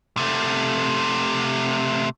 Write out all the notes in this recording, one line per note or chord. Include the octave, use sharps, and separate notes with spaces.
C3 A3